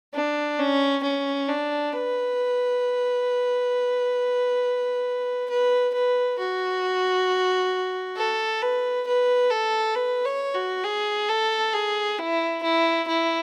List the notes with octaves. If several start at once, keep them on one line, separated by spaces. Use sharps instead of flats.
D4
C#4
C#4
D4
B4
B4
B4
F#4
A4
B4
B4
A4
B4
C#5
F#4
G#4
A4
G#4
E4
E4
E4